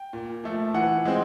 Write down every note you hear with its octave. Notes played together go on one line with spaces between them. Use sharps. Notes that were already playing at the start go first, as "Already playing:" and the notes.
Already playing: G5
A#2
F3 A3
E3 F#5
G#3 C4